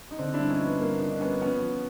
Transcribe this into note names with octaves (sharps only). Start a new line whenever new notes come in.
D#4
D3 C4 D4
D4 E4
G2
C#4 D#4
F3
B3
G2 A#3
D3 D#4
D4
G2 B3 C#4
F3 B3 C#4
F3